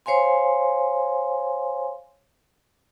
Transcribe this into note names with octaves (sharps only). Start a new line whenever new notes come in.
C5 C#5 F5 G#5 C6